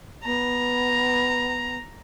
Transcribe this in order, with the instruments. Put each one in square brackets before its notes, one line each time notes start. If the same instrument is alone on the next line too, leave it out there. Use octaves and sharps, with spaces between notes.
[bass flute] B3 [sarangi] A#5